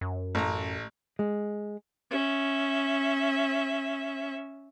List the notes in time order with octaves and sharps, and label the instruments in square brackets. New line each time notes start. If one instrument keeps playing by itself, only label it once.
[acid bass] F#2
[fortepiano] A1 A#5
[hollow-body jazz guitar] G#3
[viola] C#4 E5